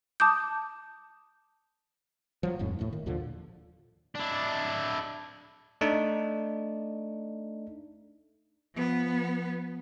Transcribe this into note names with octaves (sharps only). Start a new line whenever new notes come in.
A5 D6 D#6 G6
F3 F#3
D#1 F2 A2 G#3
D1 D#2 A2 A3
D#3
D#2 A#2 D3 F3
D4 E4
A3 D4 D#4
F3 B3